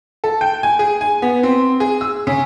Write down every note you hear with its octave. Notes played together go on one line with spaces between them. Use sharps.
A4
G5
G#5
G#4
G#5
B3
C4
G#4
E6
C#3